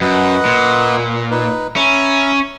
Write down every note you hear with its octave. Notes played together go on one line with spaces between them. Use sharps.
F#2 B4 D#5 F#5
A#2
D#4 B4
C#4 E5 A#5 B5